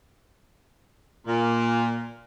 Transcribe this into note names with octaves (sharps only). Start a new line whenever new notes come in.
A#2